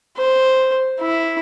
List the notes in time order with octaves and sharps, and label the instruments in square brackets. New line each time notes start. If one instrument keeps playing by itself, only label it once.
[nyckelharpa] C5
E4